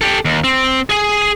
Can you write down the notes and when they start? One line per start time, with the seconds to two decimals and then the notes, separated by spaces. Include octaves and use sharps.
0.01 G4 A4
0.25 D#2
0.44 C4
0.89 G#4 G#5